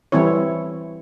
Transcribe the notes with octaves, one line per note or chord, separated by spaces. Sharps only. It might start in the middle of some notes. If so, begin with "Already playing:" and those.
E3 G3 C4 E4 C#5